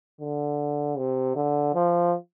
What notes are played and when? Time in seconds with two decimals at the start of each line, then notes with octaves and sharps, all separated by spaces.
0.21 D3
0.98 C3
1.36 D3
1.74 F3